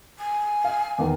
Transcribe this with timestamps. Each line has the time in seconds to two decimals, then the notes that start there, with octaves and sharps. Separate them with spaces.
0.18 G#5
0.64 F5
0.98 E2 D#3 A#3